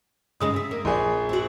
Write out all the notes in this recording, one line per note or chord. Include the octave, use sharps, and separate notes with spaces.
G#2 C#3 G#3 D#6
C3 E5
A#3
A#1 G#4 D5
C4 F#4